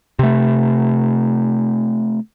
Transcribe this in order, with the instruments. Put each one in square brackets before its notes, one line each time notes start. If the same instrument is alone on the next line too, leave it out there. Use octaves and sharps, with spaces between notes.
[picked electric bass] C3 A3